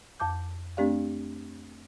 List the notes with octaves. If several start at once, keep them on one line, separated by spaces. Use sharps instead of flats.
F2 A5 D6 G6
A3 C4 D4 G4 D5 F5